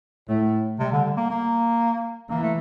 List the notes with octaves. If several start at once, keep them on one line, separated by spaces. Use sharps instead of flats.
A2 A3
C3 G3
D3
D3
A#3
A#3
E3 A#3
A3